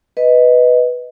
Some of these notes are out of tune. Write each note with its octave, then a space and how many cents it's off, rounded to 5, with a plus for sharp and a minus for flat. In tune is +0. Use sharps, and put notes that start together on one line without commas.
B4 +0 D#5 +5